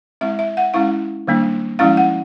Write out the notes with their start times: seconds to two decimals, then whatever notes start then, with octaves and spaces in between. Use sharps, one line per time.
0.21 G#3 C4 E4 E5
0.39 E5
0.57 F#5
0.74 G#3 C#4 E4 F5
1.27 D#3 G3 A#3 D4
1.79 F3 G#3 C#4 E4 F5
1.97 F#5